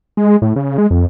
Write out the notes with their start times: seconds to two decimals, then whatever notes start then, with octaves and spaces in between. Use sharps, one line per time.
0.17 G#3
0.42 A2
0.56 C#3
0.78 G#3
0.91 F2